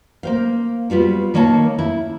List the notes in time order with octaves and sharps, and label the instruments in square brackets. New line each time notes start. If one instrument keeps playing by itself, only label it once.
[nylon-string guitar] A#3 C5 F5
G3 B3 F4 F#4
D#3 A#3 C#5 G#5 A5
E4